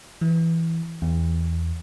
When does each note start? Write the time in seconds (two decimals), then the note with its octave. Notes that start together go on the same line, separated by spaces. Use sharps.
0.21 E3
1.02 E2